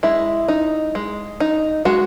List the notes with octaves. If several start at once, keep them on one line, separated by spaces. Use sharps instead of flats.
G#3 E4
D#4
G#3
D#4
G#3 F#4